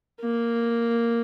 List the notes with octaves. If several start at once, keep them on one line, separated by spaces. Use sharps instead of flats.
A#3